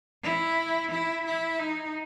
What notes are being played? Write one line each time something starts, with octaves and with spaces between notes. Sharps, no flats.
E4
E4
E4
D#4